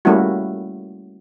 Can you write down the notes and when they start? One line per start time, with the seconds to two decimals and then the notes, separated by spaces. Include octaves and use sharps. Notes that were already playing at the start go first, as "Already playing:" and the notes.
0.05 G3 A3 A#3 C#4 E4 F#4